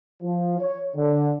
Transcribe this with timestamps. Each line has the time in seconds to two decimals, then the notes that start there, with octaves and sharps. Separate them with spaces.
0.23 F3
0.59 C#5
0.95 D3